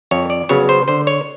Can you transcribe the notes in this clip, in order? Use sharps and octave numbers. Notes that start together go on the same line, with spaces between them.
F2 C#5
D5
C#3 F#3 B3 C#5
C5
D3 C5
C#5